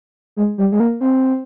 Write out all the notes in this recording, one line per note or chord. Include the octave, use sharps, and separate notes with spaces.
G#3
G3
G#3
A#3
C4